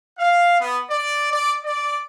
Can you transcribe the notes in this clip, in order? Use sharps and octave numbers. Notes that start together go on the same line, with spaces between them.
F5
B3
D5
D5
D5